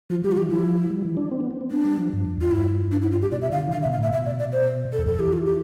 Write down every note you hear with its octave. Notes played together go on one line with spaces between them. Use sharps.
F3 F4
G3 G4
F4
E3 G4
F3 E4
G3
E3
D4
C4
B3
C4
C4
B3 D4
G3
F3
G2
F2
E2 F4
G2 E4
D4
E4
F4
G4
B2 D5
E5
D3 F5
E3
D3 F5
E5
B2
F5
A2 E5
B2 E5
D5
D5
C5
A4
E2
F2 A4
E3 G4
F4
G4